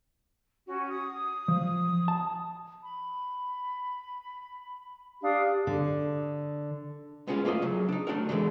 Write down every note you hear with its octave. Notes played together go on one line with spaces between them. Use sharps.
C#4 F#4
D#6
F3
A5
B5
D4 G4 F5 D#6
D3
G#3 B3 C#4 F4
A3 A#3 F4 D#5
C#3 F#3
D4 D#4
A3 D4 F#4 A#4
D3 E3 F#3 G#3